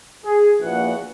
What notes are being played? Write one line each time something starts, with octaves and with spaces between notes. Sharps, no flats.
G#4
A#1 E2 A#2 F#4 F#5